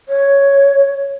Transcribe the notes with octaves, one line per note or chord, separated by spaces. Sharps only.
C#5